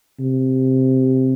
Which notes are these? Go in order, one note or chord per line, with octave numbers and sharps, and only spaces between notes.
C3